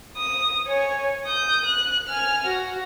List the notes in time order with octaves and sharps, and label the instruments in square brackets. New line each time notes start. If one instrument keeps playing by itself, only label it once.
[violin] D#6
C#5 G#5
D#6 G6
F#6
G#5 F6
F#4